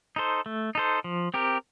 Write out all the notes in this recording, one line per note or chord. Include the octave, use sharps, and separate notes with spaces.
D#4 A4 C5
A3
D#4 A4 C5
F3
C4 G4 A#4